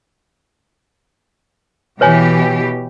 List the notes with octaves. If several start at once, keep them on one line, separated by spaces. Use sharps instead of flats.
B2 E3 G4 B4 C#5 G#5